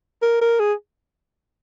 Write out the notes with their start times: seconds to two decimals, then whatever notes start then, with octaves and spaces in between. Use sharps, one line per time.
0.22 A#4
0.41 A#4
0.60 G#4